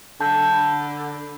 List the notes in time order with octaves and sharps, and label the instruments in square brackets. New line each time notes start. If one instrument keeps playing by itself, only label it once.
[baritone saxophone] D3 [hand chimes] A5 G6
[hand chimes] B5